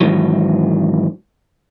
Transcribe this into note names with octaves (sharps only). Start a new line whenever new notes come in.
G#2 D#3 E3 F#3